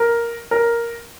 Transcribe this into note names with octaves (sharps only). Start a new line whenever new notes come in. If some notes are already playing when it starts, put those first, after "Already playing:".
Already playing: A#4
A#4